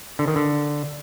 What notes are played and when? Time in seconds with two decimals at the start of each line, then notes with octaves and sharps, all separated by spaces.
0.19 D3
0.28 D#3
0.36 D3